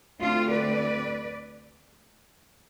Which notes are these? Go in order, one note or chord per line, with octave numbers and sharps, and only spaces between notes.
D2 D3 A3 C4 D4 F4
B4 D5